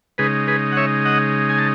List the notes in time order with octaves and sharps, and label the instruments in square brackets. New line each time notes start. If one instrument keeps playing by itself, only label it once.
[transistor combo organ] C#3 G#3 D#4 G#4 B4
G#4 B4
F#5
C#5 E5
D#5 F#5
G#5
A5